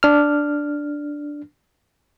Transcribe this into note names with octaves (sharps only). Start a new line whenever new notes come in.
D4 F6